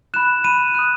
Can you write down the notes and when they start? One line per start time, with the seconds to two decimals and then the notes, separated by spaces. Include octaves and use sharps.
0.14 B5 F#6 E7
0.44 B5 D#7
0.75 D#6 F#6